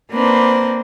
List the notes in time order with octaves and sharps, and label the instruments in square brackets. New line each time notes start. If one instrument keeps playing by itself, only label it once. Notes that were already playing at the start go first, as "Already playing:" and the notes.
[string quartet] A#3 C4 D4 D#4 B4 C5